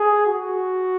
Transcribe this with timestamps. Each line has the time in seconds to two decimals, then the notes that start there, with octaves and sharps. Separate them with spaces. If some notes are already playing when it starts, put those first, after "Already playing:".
Already playing: G#4
0.26 F#4